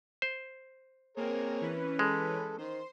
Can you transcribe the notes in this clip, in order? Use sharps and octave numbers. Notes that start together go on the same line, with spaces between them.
C5
A#3 C4 G#4 A#4 C#5
E3 C#4 B4
G#3 A4
D#3 C5 C6